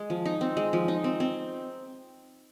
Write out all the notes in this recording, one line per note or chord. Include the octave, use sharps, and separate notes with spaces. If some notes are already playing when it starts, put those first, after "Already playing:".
Already playing: G#3
F3
D#4
C4
G#3
F3
D#4
C4
C4